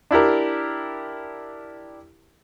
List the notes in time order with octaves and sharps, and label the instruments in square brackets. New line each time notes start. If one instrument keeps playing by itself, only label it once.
[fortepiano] D4 E4 G4 A#4